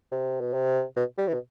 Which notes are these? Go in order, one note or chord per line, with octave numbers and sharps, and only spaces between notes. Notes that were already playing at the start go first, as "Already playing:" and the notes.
C3
B2
C3
B2
G3
E3
B2